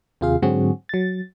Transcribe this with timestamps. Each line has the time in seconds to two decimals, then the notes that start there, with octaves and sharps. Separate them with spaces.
0.21 D#2 C3 F4 G#4 F5
0.42 G#2 D3 F#3 C4 F#4 G#4
0.89 F#3 A6